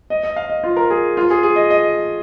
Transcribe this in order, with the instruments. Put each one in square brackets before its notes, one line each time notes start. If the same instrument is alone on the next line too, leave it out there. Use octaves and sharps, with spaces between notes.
[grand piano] D#5
D#5
F5
D#5
F4
A#4
G#4
F4
G#4
G#4
D#5
D#5